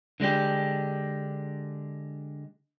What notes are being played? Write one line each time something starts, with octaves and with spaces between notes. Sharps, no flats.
D3 G#3 D4 G4